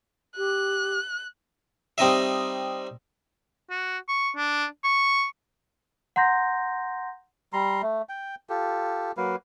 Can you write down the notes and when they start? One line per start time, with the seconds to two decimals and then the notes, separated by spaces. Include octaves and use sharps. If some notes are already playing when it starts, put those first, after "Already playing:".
0.37 G4 F#6
1.98 G3 C4 D#4 D#5 E5
3.70 F#4
4.09 C#6
4.37 D4
4.84 C#6
6.16 F#5 A#5 C6 G6 A#6
7.53 G3 A#5 C6
7.82 A3
8.09 G5
8.49 F4 G4 A4
9.17 F#3 A#3 B4 F5